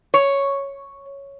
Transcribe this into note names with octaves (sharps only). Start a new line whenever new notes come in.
C#5